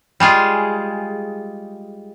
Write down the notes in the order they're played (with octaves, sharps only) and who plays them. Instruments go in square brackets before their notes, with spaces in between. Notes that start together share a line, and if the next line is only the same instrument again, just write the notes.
[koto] G3 G#3 F4 G#4